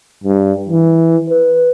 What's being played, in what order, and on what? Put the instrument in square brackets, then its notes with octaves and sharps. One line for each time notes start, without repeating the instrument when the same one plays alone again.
[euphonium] G2
E3
B4